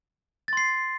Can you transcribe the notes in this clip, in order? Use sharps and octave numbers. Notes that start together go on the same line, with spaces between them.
C6 A6 C7